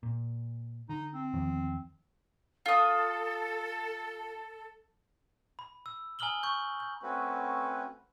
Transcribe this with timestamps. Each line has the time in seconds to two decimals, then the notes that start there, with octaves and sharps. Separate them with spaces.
0.03 A#2
0.89 D3 D#4
1.14 C4
1.33 E2 D#3 F3
2.66 F4 A4 D#6
5.59 B5
5.86 E6
6.19 G#5 A#5 D#6 F6 F#7 G7
6.43 C#6 G6
6.80 G6
7.03 A3 C4 C#4 F#4 B4